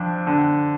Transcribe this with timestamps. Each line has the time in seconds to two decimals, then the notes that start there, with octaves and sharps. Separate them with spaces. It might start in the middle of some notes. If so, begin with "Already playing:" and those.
Already playing: F2 D4
0.27 D3